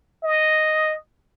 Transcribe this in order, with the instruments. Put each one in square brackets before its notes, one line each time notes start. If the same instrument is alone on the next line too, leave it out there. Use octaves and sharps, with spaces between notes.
[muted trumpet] D#5